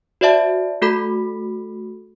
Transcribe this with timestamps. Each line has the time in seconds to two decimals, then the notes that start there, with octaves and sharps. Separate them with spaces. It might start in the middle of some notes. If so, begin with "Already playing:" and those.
0.21 F#4 C5 D5 E5 A5
0.82 A3 F#4 A4 B5 B6